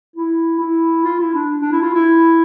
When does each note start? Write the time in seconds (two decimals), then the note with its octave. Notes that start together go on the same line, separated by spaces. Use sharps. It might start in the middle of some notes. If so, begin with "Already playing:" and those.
0.16 E4
0.60 E4
1.04 F4
1.20 E4
1.34 D4
1.61 D4
1.72 E4
1.82 F4
1.94 E4